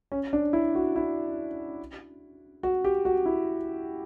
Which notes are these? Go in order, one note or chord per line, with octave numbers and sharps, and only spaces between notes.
C#4
D4
E4
F#4
E4
F#4
G4
F#4
E4